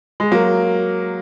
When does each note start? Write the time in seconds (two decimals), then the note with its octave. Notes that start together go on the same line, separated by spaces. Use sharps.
0.20 G#3
0.32 F#3 A#3